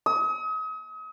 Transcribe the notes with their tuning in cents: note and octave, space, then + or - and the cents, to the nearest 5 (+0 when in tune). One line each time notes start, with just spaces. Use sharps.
D#6 +40